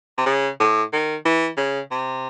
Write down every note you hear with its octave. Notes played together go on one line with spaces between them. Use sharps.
C3
C#3
A2
D#3
E3
C#3
C3